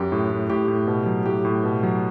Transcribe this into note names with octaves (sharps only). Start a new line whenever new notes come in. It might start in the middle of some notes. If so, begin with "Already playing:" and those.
Already playing: F#2 G4
A2
A2
A2 G4
A2
B2
F#3
A2 G4
A2
B2
F#3